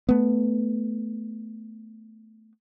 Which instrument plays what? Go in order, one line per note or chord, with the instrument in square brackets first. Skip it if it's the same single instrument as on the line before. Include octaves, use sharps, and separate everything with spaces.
[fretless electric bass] A3 B3